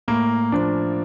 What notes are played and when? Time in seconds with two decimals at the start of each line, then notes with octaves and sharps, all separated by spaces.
0.08 A2 A#3
0.52 F3 A#3 D4